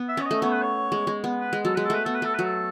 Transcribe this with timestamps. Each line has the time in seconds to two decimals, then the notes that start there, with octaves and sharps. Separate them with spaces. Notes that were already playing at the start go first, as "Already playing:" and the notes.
Already playing: B3
0.09 E5
0.17 C#4 C#5
0.26 A3 D#5
0.42 B3 C#5
0.52 B4
0.62 C#5
0.92 G#3
1.07 G#3
1.24 B3
1.40 B4
1.53 G#3
1.65 F#3 A4
1.75 G#3 B4
1.85 A4
1.90 A3 B4
2.05 B3 A4
2.15 B4
2.22 A3 A4
2.34 F#3 B4
2.45 A4